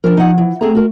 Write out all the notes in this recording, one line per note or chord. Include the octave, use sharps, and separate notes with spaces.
F3 D4 A#4
F3 D#4 F#5
E3
A3 C4 G#4 A#5
F#4 A#4